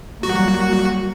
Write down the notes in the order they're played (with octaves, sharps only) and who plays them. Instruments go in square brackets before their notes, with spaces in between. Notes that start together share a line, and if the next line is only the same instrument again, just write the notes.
[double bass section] F#3 G3 A#3 [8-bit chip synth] F#4